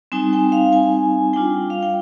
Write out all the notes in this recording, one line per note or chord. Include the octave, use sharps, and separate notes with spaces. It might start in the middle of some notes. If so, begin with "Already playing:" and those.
G3 C4 D#4 G#5
G5
F5
G#5
G3 D4 F4 G5
F5
G5